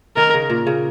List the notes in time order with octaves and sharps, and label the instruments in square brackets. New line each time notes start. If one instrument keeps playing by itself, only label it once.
[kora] D#3 [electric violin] A#4
[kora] C#3
A#2
C#3